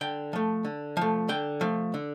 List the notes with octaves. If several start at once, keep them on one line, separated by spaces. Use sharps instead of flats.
D3 G5
F3 A3
D3
F3 A3
D3 G5
F3 A3
D3